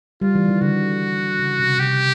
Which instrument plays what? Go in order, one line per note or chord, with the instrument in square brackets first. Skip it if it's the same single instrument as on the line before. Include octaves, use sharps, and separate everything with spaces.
[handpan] G3 [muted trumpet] F4
[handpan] E3
D#3
[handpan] D3 [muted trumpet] F#4
[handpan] C#3
C3
[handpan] C3 [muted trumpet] G4